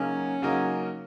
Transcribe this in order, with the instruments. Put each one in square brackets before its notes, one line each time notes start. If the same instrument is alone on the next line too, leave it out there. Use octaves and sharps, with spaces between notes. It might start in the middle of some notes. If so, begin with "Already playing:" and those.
Already playing: [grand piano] C#3 F#3 A#3 D#4 F#4 [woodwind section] C#4
[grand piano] C#3 F#3 A#3 D#4 F#4